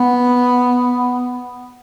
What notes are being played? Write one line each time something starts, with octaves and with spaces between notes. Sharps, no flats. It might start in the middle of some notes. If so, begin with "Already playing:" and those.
Already playing: B3